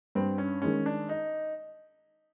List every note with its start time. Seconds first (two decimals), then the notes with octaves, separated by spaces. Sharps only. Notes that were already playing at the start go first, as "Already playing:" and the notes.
0.15 G2 C4
0.38 C#4
0.62 D#3 G#3 C#4
0.86 D4
1.09 D#4